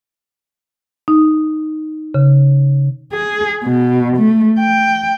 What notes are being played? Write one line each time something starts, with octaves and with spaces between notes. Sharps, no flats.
D#4
C#3
G#4
B2
A3
G5